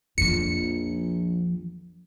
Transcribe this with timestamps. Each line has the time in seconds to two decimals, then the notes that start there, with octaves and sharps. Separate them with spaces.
0.18 A#1 F2 F3 C#7